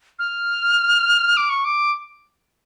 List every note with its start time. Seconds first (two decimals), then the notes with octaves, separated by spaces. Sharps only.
0.19 F6
1.37 D6
1.50 C#6
1.65 D6